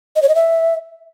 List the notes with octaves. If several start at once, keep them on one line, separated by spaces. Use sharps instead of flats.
D#5
C#5
D#5
E5